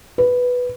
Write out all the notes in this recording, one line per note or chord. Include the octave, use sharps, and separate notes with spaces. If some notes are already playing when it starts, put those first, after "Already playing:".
B4